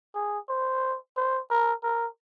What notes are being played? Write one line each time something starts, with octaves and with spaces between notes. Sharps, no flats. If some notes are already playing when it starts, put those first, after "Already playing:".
G#4
C5
C5
A#4
A#4